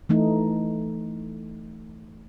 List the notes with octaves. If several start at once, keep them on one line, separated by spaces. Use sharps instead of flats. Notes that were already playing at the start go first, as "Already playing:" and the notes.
E3 A3 D#4